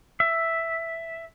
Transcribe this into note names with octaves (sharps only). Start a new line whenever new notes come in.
E5